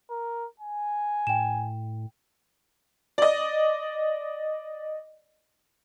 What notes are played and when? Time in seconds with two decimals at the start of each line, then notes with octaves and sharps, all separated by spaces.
0.10 A#4
0.60 G#5
1.27 A2 G5 E7
3.18 D5 D#5